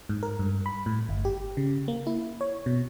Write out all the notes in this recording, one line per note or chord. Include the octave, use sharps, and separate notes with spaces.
G#2
A#4
G2
B5
A2
G1
G4
C#3
A#3
E4
C#5
B2